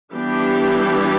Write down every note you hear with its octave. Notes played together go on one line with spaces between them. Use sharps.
E3 G3 B3 D4 G4